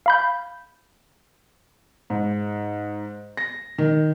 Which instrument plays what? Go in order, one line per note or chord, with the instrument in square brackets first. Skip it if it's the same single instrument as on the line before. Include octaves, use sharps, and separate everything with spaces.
[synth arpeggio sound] F5 B5 G6
[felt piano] G#2
A#6
D#3